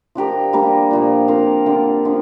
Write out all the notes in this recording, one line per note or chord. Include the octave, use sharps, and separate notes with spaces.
F3 D4 G4 A#4
G3 A#3 D4 A#4
A#2 F3 A#3
C4 F4 A#4 F5
D3 A#3 G4 D5
D3 F3 D4